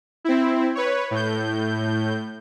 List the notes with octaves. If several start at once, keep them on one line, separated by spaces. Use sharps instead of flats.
C4 E4
B4 C#5
A2 G6